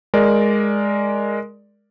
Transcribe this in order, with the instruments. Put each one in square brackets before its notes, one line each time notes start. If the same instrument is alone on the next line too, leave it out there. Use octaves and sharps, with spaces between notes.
[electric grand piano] G#3 A#4 D5